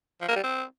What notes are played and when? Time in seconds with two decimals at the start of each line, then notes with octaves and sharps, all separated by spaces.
0.21 F3
0.29 A#3
0.36 G3
0.43 C4